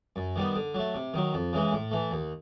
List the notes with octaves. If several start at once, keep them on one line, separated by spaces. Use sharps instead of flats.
F#2
D#3 G3 B3
D3
F#3 A3
C3
D#3 F#3
F2
C#3 E3 G#3
A2
E3 A3
D#2